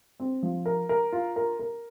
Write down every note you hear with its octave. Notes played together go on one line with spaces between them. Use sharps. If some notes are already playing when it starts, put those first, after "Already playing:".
C4
F3
A#4
A#4
F4
A#4
A#4